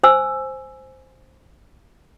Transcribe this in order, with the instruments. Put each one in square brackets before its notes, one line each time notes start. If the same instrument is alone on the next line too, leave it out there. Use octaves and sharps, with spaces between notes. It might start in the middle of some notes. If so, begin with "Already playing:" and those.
[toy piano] C5 G#5 E6